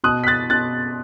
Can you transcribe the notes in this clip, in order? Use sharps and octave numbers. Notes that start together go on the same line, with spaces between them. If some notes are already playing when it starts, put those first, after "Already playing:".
B2 D#6 F#6
B6
F#6 A6
B2 F#6 A6